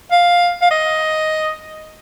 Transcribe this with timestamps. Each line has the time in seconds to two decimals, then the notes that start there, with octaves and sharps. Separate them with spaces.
0.12 F5
0.62 F5
0.71 D#5